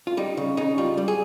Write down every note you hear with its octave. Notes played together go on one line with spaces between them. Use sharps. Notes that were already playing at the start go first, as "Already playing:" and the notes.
F4
G3 D#4
C#3
C#3 D#4
G3 F4
G3
G#4